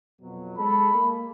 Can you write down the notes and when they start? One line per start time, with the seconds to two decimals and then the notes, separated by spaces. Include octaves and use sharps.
0.21 F2 B2 F#3
0.58 G#3 A4 B5
0.93 A#3